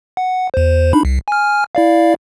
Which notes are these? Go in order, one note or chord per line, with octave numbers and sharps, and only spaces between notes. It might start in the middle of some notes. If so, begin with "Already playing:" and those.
F#5
E2 C5
D4 D#4 B5
C2
G#5 F6
E4 D5 F5